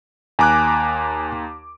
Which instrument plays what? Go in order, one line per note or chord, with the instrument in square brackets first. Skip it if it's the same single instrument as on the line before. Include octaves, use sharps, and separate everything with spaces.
[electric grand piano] D#2 A#5 D6 [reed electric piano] G#5 F#6